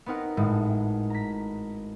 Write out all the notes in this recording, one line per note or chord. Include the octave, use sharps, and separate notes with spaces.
B3 C4 D#4 A#4 F#5
G#1 A2 G#3
A#5 B6